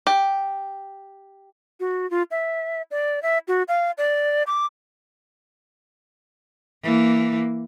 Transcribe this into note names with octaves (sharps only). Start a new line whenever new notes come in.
G4
F#4
F4
E5
D5
E5
F#4
F5
D5
D6
E3 A#3